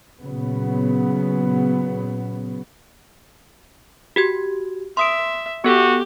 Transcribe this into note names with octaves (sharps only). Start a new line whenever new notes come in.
A#2 C#3 F#3 B3
F#4 G4 G#6
E5 C6 D#6 D7
B3 F#4 G4 A4